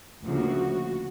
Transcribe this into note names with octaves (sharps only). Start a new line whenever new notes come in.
D2 C#3 F3 A#3 F#4